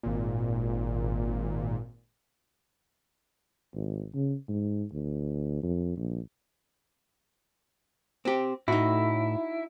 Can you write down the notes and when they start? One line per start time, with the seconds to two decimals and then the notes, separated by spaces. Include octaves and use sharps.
0.03 G#1 A#2
3.75 G#1
4.14 C#3
4.48 G#2
4.93 D2
5.63 F2
5.97 A#1
8.25 C4 G4
8.68 A2 D#4 E4 F#4